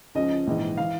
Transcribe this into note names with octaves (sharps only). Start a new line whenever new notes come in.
C#2 C#3 F3 D#5
A#1 G#2 E3
E3 F5